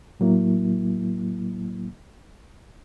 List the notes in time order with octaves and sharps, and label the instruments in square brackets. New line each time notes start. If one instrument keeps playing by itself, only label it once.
[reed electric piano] A2 F#3 A#3 E4